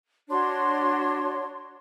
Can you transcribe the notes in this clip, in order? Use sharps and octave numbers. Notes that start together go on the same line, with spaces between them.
D4 F#4 C#5 C6